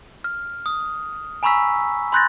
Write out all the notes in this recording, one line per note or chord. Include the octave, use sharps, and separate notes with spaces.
F6
D#6
G#5 A#5 B5 C#6 E6 B6
B5 C6 F#6 G6 A6 A#6